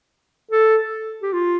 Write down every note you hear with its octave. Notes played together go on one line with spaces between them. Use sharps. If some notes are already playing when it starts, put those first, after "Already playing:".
A4
G4
F4